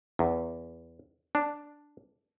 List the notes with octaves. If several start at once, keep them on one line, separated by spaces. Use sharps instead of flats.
E2
D4